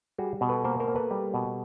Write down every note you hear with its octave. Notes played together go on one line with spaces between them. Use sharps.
G3 F#4 G#4
B2
A4 B4
A#3 A#4 C5
A#4 C5
A#3
A4 B4
G3
B2